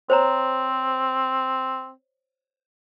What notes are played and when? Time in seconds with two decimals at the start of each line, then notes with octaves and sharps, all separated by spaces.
0.10 C4 C5 C#5 A#5